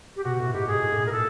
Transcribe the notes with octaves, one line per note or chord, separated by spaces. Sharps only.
G4
B2 F#4
A2
G#2 G4
G#2 G#4
A2
A2
A#2 A#4
A4